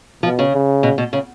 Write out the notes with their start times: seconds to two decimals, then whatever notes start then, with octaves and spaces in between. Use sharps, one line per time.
0.23 B2 F3
0.39 C#3
0.54 C#3
0.83 B2
0.98 B2
1.13 C#3